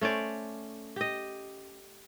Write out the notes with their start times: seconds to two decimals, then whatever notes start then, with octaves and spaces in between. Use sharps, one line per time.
0.01 A3 C#4 C5 D5
0.96 G4 D#5